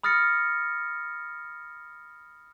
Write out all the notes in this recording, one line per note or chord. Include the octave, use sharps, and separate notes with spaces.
B5 D#6 F6 A6 A#6 C#7